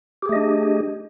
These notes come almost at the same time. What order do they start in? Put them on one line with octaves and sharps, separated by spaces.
G4 G#4 A3 D#5 D4